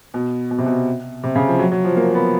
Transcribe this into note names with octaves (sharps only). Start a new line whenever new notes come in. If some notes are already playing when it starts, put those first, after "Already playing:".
B2
B2
C3
B2
C3
C#3
F3
F#3
F#3
F3
A#3
B3